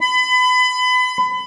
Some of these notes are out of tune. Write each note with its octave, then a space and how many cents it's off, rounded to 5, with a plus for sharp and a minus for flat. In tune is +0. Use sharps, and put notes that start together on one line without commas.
B5 +30